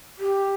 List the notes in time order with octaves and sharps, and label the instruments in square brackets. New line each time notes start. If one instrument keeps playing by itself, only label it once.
[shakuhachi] G4